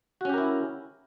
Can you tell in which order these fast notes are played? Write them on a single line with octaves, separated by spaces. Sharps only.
F#4 C#4 G4 A#4 E4